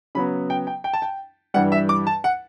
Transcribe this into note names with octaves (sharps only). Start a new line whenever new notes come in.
C#3 F#3 B3 B5
G5
G5
G5
A5
G5
G2 E3 G3 F#5
E5
D6
A5
F#5